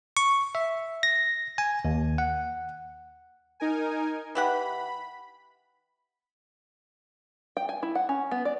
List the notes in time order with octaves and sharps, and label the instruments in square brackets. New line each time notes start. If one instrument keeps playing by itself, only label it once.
[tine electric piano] C#6
E5
A#6
G#5
D#2
F#5
[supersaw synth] D#4 A#4 G#5
[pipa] E3 G4 F#5 [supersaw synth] B5
[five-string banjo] G5
G#5
E4
F#5
C#4
B3
D5